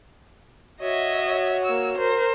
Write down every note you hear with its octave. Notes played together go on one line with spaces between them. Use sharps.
F#4 C#5 D#5 E5
A#3 E6
A#4 C5